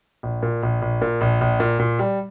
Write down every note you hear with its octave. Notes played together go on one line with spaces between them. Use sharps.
A#1
A#2
A#1
A#1
A#2
A#1
A#1
A#2
A#2
G3